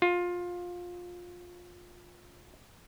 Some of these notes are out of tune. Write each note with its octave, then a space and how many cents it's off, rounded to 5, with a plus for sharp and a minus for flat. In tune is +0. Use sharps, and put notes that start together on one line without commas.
F4 +20